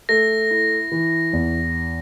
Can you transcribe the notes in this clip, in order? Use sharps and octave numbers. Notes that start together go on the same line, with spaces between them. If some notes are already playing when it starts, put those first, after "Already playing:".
A3 A#6
E4
E3
E2